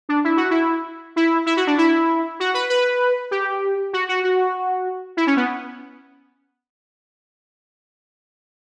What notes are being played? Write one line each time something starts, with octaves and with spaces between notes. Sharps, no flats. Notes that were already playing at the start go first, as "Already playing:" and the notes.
D4
E4
F#4
E4
E4
E4
F#4
D4
E4
F#4
B4
B4
G4
F#4
F#4
F#4
E4
C#4
B3